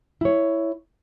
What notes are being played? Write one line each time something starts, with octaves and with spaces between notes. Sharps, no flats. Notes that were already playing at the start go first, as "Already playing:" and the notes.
E4 C#5